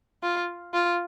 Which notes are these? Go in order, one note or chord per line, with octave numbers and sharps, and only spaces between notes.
F4
F4